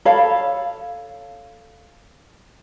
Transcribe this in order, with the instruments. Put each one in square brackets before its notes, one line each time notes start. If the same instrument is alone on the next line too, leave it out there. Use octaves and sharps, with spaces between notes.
[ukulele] A4 C#5 F5 B5